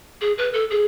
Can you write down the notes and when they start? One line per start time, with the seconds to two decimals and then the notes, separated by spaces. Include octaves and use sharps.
0.21 G#4
0.38 B4
0.53 A4
0.71 G#4